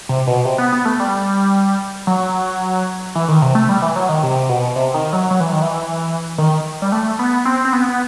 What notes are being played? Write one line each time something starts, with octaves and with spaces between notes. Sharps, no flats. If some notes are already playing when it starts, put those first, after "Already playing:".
C3
B2
C3
B3
B3
A3
G3
F#3
E3
D#3
C3
A3
G3
E3
F#3
D#3
C3
B2
C3
D#3
F#3
F#3
E3
D#3
E3
D#3
G3
A3
B3
C4
C4
B3
B3